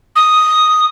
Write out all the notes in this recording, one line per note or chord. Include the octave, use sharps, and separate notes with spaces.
D#6